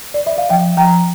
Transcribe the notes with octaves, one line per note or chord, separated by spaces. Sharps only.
D5
E5
F5
F3 E5 G5
F3 G5 A#5